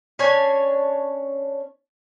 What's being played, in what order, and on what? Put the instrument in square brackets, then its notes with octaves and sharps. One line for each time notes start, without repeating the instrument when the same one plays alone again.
[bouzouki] C#4 D4 C#5 G#5